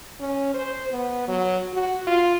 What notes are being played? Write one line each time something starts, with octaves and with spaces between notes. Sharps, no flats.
C#4
C5
B3
F#3
F#4
F4